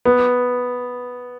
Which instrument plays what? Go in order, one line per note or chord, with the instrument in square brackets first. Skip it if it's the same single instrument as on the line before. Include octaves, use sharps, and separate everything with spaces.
[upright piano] B3